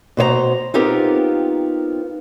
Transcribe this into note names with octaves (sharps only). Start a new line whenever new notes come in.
B2 C5 D5 A#5
B3 C4 D#4 F4 G4 A#4